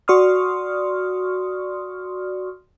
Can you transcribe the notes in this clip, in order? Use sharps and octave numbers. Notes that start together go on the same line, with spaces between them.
F#4 D5 C6 C#6 D#6 F6